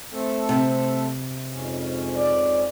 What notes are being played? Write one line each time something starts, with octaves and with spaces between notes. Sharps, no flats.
A3 C4 A4
C3
F2 G#2 C#4
D5